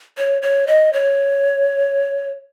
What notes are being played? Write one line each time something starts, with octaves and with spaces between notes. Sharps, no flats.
C#5
C#5
D#5
C#5